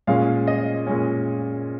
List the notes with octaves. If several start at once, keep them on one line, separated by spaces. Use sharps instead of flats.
A#2 G#3 C#4 F5
D#5
A#2 G#3 C#4